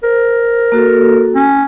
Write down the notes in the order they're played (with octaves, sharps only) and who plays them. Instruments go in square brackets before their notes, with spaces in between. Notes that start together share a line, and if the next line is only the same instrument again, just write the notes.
[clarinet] A#4 [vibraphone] C5
[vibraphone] A#3 F#4 A4
[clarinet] C#4